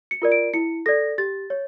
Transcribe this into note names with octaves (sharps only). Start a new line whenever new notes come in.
C#7
F4 A#4 D5
D7
E4 C#7
A4 D5 A#6
G4 A6
C#5